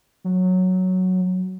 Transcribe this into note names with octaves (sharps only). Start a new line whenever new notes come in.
F#3